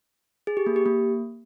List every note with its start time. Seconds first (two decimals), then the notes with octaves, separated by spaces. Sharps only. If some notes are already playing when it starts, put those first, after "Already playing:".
0.47 G#4
0.57 G4
0.66 A#3
0.76 G4
0.86 A#3